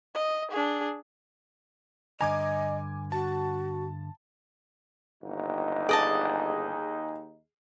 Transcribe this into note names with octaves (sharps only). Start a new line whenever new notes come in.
D#5
D4 G#4
G2 D3 D#5 G#5 A#5 D6 G#6
F#4 A5
G1 D#2 D#4
G#4 D5 D#5 A5